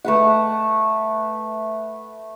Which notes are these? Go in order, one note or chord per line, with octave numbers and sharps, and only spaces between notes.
A3 B4 F#5